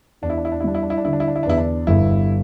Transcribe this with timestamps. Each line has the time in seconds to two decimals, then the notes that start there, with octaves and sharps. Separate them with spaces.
0.22 E2 D4
0.30 E4
0.37 D4
0.45 E4
0.52 D4
0.60 E4
0.64 G3 D4
0.75 E4
0.83 D4
0.90 E4
0.97 D4
1.05 D3 E4
1.13 D4
1.20 E4
1.27 D4
1.36 E4
1.43 D4
1.46 E2 E4
1.57 D4
1.87 G1 E4